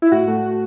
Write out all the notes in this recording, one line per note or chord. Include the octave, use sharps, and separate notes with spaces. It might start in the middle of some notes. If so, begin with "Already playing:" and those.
E4
A2 F#4
A3